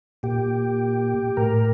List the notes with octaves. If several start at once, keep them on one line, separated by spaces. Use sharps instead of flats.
A#2 G4
A2 A#4